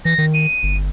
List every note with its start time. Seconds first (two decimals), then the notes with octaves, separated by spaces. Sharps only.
0.05 E3 A#6
0.18 D#3
0.34 D#7
0.63 G1